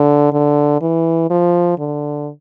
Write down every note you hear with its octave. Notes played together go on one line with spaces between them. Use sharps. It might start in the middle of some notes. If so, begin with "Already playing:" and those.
Already playing: D3
D3
E3
F3
D3